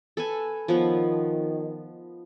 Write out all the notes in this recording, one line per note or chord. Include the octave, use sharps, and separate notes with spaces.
A4 B4 G#5
D#3 F3 B3 C#5